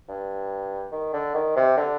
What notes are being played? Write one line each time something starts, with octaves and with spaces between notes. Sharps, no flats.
G2
D#3
D3
D#3
C3
D3